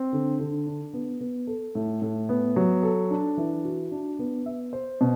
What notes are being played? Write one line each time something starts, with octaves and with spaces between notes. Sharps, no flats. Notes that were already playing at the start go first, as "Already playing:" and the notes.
Already playing: C4
D3
D3
D4
B3
B3
A4
A2
A2
B3
F#3
A4
D4
E3
F#4
D4
B3
E5
C5
B2